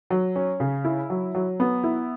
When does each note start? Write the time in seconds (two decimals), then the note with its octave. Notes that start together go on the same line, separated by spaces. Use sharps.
0.10 F#3
0.36 C#4
0.60 C#3
0.85 E4
1.10 F#3
1.35 F#3
1.60 B3
1.84 E4